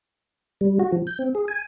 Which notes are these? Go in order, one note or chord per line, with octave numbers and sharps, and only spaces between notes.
G3
F#4
F3
G6
C4
G#4
G#5